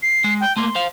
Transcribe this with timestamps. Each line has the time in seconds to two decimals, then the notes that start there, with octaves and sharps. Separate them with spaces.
0.02 C7
0.24 G#3
0.40 G5
0.57 A3 A#3 C6
0.75 C5 F5